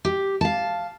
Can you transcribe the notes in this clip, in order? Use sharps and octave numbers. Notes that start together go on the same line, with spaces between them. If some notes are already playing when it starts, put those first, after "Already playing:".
G4
F5 A5